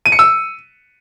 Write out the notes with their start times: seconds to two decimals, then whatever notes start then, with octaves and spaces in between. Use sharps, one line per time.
0.06 D#7
0.12 C#7
0.19 E6